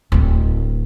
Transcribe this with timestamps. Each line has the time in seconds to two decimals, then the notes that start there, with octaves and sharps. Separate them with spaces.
0.12 D1 C4